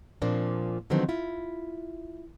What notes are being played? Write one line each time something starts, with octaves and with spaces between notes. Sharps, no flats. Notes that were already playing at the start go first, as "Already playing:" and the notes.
A#2 F3 A#3 C4 D4
D3 D#3 F3 F#3 B3 C4
E4 F4